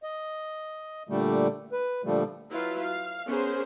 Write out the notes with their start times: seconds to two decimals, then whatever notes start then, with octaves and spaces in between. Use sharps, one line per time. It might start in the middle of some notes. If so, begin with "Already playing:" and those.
0.03 D#5
1.09 A#2 D3 G3 A3
1.72 B4
2.04 A#2 D3 F3 G3 A3
2.50 F#3 E4 F4 B4 F5
2.80 F5
3.28 B3 C#4 G#4 A#4 C5